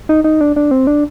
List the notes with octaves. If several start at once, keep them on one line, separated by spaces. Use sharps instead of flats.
D#4
D#4
D4
D4
C4
D4